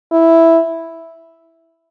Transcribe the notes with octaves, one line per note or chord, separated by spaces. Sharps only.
E4